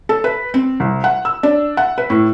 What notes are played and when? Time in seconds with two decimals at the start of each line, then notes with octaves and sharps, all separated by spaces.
0.09 A4
0.24 B4
0.54 C4
0.80 C2
1.04 F#5
1.25 E6
1.43 D4
1.77 F#5
1.98 B4
2.10 A2